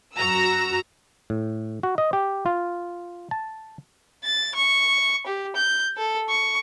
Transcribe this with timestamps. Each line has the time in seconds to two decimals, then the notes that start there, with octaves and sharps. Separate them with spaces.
0.16 F#2 F#4 A#5 E6
1.30 A2
1.83 F#4
1.98 D#5
2.13 G4
2.46 F4
3.31 A5
4.24 A6
4.55 C#6
5.27 G4
5.56 G6
5.97 A4
6.29 C#6